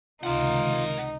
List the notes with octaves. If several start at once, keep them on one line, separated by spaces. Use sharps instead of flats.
C#2 C3 D#3 D#4 F4 A#4 F#5